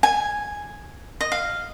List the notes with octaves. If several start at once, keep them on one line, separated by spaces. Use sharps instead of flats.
G#5
D#5
F5